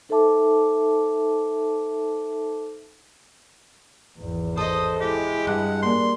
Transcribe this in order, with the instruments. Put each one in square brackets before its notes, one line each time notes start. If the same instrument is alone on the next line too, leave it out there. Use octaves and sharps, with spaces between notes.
[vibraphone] D#4 A4 C5 E5 A5 D6
[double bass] G#1 E2
[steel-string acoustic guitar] A4 D#5 [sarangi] C5 [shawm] D#6
[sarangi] G#3 [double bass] E4 [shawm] G4
[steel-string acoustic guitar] G2 [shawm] F#5
[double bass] A#3 D4 [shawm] C6